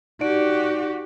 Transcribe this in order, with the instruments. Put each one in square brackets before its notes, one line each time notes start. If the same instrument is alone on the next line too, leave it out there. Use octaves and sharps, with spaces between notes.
[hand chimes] D#4 D5 D7 [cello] F#4 G4